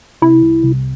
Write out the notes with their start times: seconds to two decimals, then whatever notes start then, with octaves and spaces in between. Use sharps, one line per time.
0.22 C3 E4
0.42 C2
0.63 C2